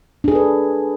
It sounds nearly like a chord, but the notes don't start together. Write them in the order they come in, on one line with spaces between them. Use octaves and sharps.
D4 G#4 A4 B4